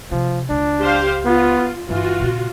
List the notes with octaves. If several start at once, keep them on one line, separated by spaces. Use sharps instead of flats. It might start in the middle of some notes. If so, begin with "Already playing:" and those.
C3 F3
C#2 D4
G4 C5 F5
B3 F4
G1 E3 F4 F#4
A#2 C#3